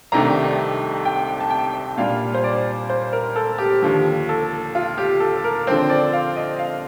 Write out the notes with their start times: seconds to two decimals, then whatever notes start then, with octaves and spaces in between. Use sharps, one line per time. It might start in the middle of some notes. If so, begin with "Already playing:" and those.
0.12 C2 C3 D#3 A3 D4 A#5
1.05 G5
1.40 A5
1.50 G5
1.97 A#2 G3 D4 F4 F5
2.34 C5
2.44 D5
2.90 C5
3.13 A#4
3.36 A4
3.58 G4
3.82 D#2 D3 F3 G4
4.29 A4
4.75 F4
4.98 G4
5.20 A4
5.44 A#4
5.67 D3 F3 C4 C5
5.89 D5
6.13 F5
6.36 D#5
6.59 F5